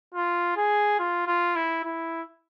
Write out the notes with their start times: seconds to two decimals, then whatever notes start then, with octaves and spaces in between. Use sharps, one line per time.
0.14 F4
0.57 G#4
0.99 F4
1.27 F4
1.56 E4
1.84 E4